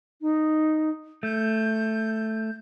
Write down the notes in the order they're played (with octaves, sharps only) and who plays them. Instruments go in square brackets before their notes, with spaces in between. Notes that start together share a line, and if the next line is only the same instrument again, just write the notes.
[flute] D#4
[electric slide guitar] A3 [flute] G6